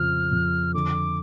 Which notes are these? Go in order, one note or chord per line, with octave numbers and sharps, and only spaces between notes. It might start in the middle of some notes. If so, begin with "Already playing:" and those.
Already playing: F2 C#3 F3 F6
F2
D3 D6